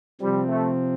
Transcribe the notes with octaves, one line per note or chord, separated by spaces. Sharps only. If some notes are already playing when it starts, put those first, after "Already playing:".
C3 F3 G3 C4
A3